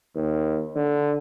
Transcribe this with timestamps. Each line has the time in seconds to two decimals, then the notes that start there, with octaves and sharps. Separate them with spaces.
0.15 D#2
0.76 D3